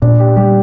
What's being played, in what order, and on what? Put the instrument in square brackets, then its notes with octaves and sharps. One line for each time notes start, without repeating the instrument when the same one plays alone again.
[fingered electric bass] A#2 [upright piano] D4
[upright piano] G4
[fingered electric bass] G3 [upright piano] G4